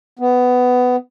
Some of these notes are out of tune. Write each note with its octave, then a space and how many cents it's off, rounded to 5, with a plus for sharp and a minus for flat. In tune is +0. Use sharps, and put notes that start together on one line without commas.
B3 +15